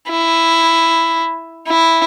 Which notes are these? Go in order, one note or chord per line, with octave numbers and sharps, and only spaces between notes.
E4
E4